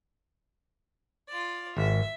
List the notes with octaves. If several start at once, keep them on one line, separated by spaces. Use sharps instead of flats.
F4 D5
G#1 E5